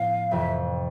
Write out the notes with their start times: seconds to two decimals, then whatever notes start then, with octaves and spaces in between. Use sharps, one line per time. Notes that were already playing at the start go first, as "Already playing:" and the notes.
Already playing: A2 F3 B3 F5
0.31 F1 F2 C3 E3 E5